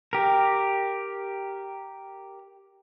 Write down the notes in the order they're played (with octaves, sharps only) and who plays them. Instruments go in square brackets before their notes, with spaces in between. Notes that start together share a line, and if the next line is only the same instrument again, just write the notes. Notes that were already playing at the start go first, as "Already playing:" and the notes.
[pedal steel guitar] G4 A#4